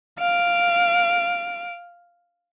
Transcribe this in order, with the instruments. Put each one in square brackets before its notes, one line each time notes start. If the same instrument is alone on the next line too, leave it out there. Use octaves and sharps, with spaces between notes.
[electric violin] F5 D7